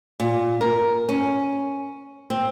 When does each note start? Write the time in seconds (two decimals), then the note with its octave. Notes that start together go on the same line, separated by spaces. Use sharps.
0.20 A#2
0.61 A#4
1.09 C#4
2.30 C4